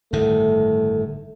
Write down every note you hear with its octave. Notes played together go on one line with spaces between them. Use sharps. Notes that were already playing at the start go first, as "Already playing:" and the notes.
G1 A2 D#3 A3